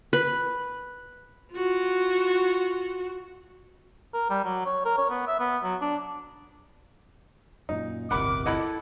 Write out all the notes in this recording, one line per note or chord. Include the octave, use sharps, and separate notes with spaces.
B4
F4 F#4
A#4
G3
F#3
C#5
A#4
C#5
B3
E5
B3
F#3
D4
F#2 A#2 D#4
D1 G1 C3 A#4 F#5 B5 D6
E4 A4 D#5 F#5 B5